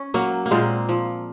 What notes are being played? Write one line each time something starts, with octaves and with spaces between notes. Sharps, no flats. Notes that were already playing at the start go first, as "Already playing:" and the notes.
Already playing: C#4
F#3 A#3
A#3
A#2 G#3 C4
F3